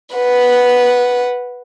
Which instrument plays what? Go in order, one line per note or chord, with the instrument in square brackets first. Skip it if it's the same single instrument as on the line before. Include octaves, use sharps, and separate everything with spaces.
[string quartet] B4 F#5